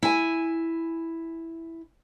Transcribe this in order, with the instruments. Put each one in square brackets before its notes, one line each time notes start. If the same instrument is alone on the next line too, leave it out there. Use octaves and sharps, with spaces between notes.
[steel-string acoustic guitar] E4 G#5